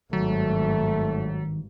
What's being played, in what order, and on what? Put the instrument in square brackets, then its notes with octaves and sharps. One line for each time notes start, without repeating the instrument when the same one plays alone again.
[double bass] G#1 G2 [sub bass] D#3 [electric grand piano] F#3 [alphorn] A3